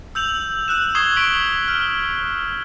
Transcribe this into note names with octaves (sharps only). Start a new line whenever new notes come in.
E6 G6 F7 F#7
E6 F#6 E7
C#6 D#6 G#6 C7 E7 G7
C#6 B6 D7 F#7
F6